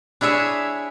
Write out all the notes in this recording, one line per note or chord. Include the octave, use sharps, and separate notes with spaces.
D4 E4 G#4 C#5 E5